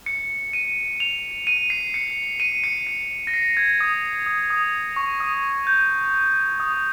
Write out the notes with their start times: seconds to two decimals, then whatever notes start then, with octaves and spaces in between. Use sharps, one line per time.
0.06 C#7
0.53 D#7
1.00 F7
1.47 D#7
1.70 C7
1.94 C#7
2.40 D#7
2.64 C#7
2.87 C#7
3.27 A#6
3.34 C7
3.57 G#6
3.81 D#6
4.26 D#6
4.50 D#6
4.96 C#6
5.20 D#6
5.67 G6
6.60 D#6